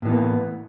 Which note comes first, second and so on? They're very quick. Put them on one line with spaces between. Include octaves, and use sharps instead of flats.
A2 E3 B3 A#3